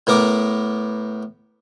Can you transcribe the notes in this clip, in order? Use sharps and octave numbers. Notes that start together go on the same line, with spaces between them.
A2 B3 A#4 D6